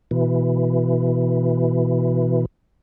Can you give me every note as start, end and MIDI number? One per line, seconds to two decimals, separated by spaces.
0.11 2.45 47
0.11 2.45 52